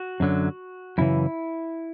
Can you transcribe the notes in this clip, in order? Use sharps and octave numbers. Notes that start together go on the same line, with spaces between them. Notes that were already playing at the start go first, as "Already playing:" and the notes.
Already playing: F#4
F#2 D3 F#3
F#2 C#3 E3 E4